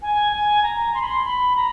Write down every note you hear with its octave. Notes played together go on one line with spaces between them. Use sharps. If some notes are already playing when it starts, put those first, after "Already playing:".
G#5
G#5
A#5
C6
B5
C6
B5
A#5